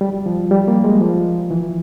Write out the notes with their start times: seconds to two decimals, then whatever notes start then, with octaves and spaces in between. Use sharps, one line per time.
0.01 G3
0.26 F3
0.51 G3
0.68 A#3
0.84 G#3
1.01 F3
1.51 E3